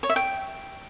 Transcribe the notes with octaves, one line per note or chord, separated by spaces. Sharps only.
C#5
E5
G5